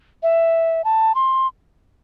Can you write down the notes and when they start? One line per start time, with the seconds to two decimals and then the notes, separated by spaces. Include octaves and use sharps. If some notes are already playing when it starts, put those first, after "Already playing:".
0.23 E5
0.84 A5
1.15 C6